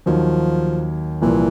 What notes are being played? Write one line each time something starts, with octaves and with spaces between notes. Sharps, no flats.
D#2 D#3 F3 F#3
C2 A#2 E3 F3 A#3